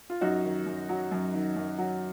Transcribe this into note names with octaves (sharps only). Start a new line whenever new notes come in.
F4
F#2 D#4 F#4
D#3
F#2
F#3
F#2
D#3
F#2
F#3